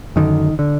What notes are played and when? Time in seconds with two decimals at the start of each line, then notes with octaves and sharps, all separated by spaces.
0.16 F#2 D3 D#3
0.59 D3